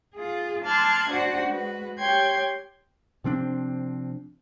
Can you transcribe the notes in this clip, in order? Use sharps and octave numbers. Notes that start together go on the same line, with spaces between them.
F4 G#4
A5 C6 D6 F6 F#6 G#6
D4 F#4 C5 D5 F#5
G#3 F#4 B4
G4 C#5 G5 C6 G6 G#6
C3 F3 C4 D4